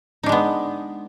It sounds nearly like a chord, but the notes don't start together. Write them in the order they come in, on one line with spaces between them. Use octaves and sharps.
D#4 D4 G#3 B3